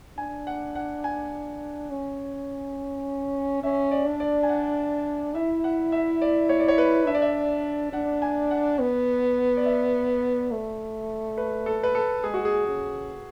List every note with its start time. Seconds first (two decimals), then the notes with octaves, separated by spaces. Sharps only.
0.18 D4 G#5
0.47 F#5
0.75 F#5
1.04 G#5
1.90 C#4
3.63 C#4 E5
3.91 D5
4.06 D4
4.20 D5
4.43 G#5
4.49 F#5
5.35 E4 E5
5.64 F#5
5.92 E5
6.22 D5
6.49 C#5
6.60 D5
6.68 C#5
6.78 B4
7.07 D4 E5
7.15 D5
7.22 E5
7.93 D4 F#5
8.22 G#5
8.51 F#5
8.80 B3
9.57 D5
9.65 E5
10.52 A3
11.38 B4
11.66 A4
11.83 B4
11.95 A4
12.24 G#3 G#4
12.34 F#4
12.45 G#4
12.67 C#3